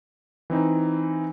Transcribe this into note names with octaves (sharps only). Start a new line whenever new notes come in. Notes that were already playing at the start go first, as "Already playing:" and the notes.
E3 C4 D#4